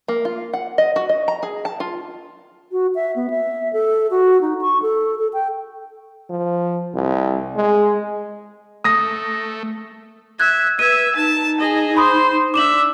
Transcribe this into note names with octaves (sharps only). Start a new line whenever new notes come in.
A#3
F4
F#5
D#5
F#4
D#5
A#5
G#4
A5
F4
F#4
E5
B3
E5
A4
F#4
D#4
C#6
A4
A4
G5
F3
C2
G#3
A3 D#6 A#6
E5 F#6 G#6
B4 E5 G#6 D#7
D#4 A5
G#4 D#5
C5 B5 C6 D#6
D4 E5 D6 E7 F#7